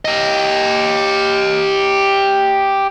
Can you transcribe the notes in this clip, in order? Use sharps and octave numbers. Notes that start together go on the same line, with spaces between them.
G4 D#5